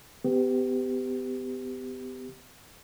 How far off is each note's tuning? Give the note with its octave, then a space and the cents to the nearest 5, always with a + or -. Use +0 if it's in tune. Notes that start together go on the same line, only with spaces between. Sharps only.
B3 +35 G4 +0